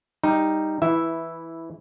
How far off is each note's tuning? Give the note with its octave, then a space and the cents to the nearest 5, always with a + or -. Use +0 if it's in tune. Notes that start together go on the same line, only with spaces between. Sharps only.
G3 +0 D#4 +0
E3 +0 E4 -5 E5 +0